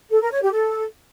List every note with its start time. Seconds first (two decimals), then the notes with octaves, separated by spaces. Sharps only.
0.10 A4
0.21 A#4
0.31 C#5
0.42 G4
0.52 A4